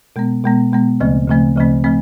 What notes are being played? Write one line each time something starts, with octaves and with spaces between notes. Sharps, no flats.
B2 G#3 B3
B2 G#3 B3
B2 G#3 B3
D2 C#3 F3 A3 C4
D2 C#3 F3 A3 C4
D2 C#3 F3 A3 C4
F3 A3 C4